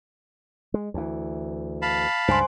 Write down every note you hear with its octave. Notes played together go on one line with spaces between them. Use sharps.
G#3
D2 E3
F5 A5 B5
C#2 G2 C5 G#5 C6